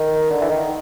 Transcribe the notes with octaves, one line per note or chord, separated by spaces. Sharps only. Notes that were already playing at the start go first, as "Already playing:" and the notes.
Already playing: D#3
D3
E3
D#3